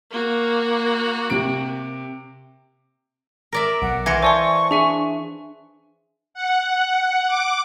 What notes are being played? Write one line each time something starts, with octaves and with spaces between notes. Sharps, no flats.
A#3 F#4
C3 D7
A#4 D5 E5
B1 F#5
E3 F4 G#6 A#6 C#7
C5 D5 E5 G#5 A5 C6 C#6
D4 G#4 E5 G#5
F#5
D6